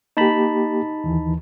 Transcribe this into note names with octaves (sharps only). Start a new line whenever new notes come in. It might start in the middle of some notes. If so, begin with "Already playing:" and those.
A#3 D#4 G4 A5 B5
D#2 E3